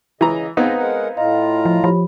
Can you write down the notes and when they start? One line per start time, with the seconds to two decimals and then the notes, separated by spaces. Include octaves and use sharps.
0.21 C#3 E3 D#5 A#5
0.57 G#3 B3 C4 D#4 B4 F5 A#5 G#6
0.78 G#3 A#4 F#5
1.17 A2 F4 D#5 F5 A#5
1.65 F3
1.84 F3 G4 C#5 B5